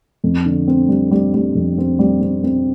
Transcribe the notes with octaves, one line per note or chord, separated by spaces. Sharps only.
F2
D3
C4
G3
G3
G3
F2
C4
G3
C4
C4